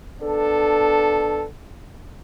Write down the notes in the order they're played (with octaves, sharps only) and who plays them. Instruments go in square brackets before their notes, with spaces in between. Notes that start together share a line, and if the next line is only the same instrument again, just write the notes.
[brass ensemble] B3 D4 A4